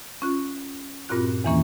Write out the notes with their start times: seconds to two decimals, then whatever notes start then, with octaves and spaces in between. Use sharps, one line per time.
0.22 C#4 F4 F#6
1.09 G2 A#2 C4 F4 F#4 F#6
1.44 E2 D#3 E3 A#3 C#4